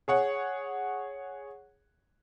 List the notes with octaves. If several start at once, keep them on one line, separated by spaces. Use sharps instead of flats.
G#4 C#5 F#5